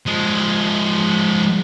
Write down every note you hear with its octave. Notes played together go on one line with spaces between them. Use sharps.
F3 G#3